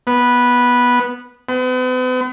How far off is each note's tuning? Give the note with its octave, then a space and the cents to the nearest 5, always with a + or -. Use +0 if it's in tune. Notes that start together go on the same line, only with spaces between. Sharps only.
B3 -10
B3 +45